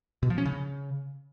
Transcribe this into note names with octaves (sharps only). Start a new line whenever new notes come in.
B2
F3
C#4
C#3